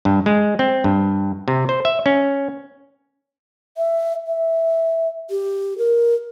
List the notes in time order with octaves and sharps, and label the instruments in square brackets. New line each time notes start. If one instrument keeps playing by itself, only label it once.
[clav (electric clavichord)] G2
G#3
C4
G2
C3
C5
E5
C#4
[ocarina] E5
E5
G4
A#4